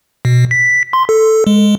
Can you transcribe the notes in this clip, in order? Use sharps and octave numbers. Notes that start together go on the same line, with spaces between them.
B2
B6
C6
A4
G#3